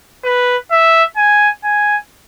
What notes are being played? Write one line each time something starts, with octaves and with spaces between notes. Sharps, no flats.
B4
E5
G#5
G#5